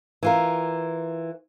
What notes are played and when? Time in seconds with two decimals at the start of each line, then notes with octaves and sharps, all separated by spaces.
0.23 E3 F4 A#4